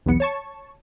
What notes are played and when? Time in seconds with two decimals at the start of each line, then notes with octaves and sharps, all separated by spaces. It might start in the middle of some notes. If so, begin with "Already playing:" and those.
0.06 B1 E2 B3 C#7
0.20 C#5 A5 C#6